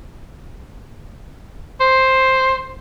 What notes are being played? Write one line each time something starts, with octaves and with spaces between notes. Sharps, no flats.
C5